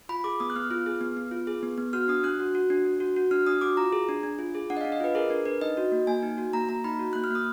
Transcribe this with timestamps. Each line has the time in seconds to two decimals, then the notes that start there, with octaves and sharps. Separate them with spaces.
0.09 F4 B5
0.24 G#4 D6
0.40 B3 D#6
0.50 F#6
0.56 B3 F6
0.71 F4
0.86 G#4
1.01 B3
1.17 B3
1.31 F4
1.47 G#4
1.63 B3
1.78 B3
1.93 F#4 F6
2.08 D4 D#6
2.23 D4 F#6
2.40 F#4
2.55 F#4
2.70 D4
2.85 D4
3.00 F#4
3.16 F#4
3.31 D4 F6
3.46 D4 D#6
3.61 F#4 D6
3.77 F4 A#5
3.93 G#4
4.09 D4
4.23 D4
4.39 F4
4.55 G#4
4.70 D4 F#5
4.77 D#5
4.81 D4 F5
4.92 D#5
5.00 F4 B4
5.15 G#4 A#4
5.30 D4 A#4
5.45 D4 B4
5.61 D#4 D#5
5.77 F#4
5.92 A#3
6.07 A#3 G#5
6.23 D#4
6.38 F#4
6.53 A#3 A#5
6.69 A#3 A#5
6.84 D#4 B5
6.99 F#4
7.13 A#3 F#6
7.24 F6
7.30 A#3 D#6